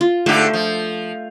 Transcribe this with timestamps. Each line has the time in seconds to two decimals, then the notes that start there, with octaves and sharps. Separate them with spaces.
0.01 F4
0.26 G#2 D3 A3 G4
0.53 F3